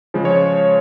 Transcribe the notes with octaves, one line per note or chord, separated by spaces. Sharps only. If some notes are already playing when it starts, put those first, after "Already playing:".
C#3 F3 G#3
C#5